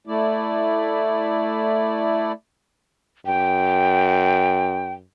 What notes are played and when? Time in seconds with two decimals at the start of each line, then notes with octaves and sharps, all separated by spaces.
0.07 A3 E4 D5
3.26 F#2 G5